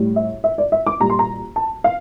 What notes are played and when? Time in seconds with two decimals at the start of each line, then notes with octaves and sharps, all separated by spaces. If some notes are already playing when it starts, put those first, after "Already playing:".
Already playing: A2 G3
0.16 E5
0.44 E5
0.58 D5
0.72 E5
0.87 D6
1.00 A#2 G3 A#5
1.10 C6
1.19 A#5
1.56 A5
1.84 F5